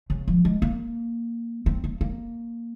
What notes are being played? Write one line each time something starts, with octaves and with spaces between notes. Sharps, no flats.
C#3
F3
G#3
A#3
C4
A#3
A#3